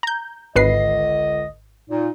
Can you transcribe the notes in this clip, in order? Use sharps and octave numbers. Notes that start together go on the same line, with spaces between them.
A#5 G6
G#1 C#2 D3 B4 D#5 C7
A#2 D#4